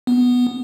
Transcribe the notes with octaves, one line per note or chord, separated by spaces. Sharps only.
B3